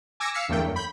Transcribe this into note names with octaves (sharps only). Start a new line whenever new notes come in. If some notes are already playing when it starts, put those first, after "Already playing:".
G#5 D6 E6 G#6 A#6 C#7
F5 E6 B6 C#7
G1 E2 D3 A3 A#3 G5
F#2
B5 G6